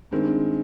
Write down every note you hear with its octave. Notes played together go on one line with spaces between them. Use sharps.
G2 D#3 G#3 C4